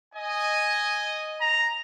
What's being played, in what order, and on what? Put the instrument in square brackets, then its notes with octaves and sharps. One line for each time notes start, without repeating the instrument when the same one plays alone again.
[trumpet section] D#5 G#5
[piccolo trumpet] A#5